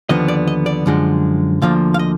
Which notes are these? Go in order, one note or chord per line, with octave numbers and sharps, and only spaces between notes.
D#2 D3 F3 B3 D#5
D5
D#5
D5
F#2 D3 F3 G#3
D2 D3 F3 A#3 F5
F5
D#5